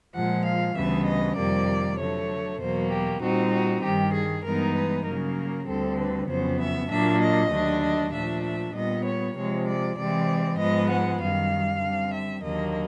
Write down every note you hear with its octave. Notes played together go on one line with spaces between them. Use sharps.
A#2 F3 G#3 F#5
F5
D2 C#3 E3 G3 B3 E5
D#5
F2 C3 D#3 G3 A#3 D5
D3 F#3 A3 C#5
E2 B2 F#3 A#3 C5
G4
A#2 G3 C4 D#4 F#4
F#4
G2 D#3 G3 G4
G#4
G2 E3 G#3 B3 D#4 A#4
B4
C#3 F#3 A#3 A#4
D2 D3 G3 C4 A4
B4
F2 C#3 F#3 B3 C5
E5
A#2 F#3 A#3 D4 E5
D#5
D#2 D3 F#3 A3 D4
D#5
A#2 F3 A3 D4 E5
E5
A#2 G3 B3 D#5
C#5
C3 F3 G#3 C#5
D5
C3 E3 G#3 C4 D5
G#2 F3 G#3 B3 D#5
F#5
F#2 D#3 G3 F5
D3 G3 C4
E5
D#2 D3 F#3 A#3 D#5